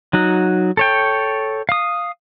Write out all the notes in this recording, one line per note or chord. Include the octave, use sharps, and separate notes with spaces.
F#3 D#4 F#4
A4 C#5 G5
F5 D#6